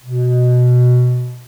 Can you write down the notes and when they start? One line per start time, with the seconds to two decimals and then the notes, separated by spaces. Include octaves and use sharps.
0.03 B2